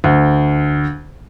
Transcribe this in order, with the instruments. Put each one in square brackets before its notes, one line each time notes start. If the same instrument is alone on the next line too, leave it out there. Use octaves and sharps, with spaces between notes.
[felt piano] D2